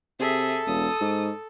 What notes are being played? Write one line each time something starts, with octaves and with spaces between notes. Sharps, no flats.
C3 G#4 A4 E5
E1 D#6
G#2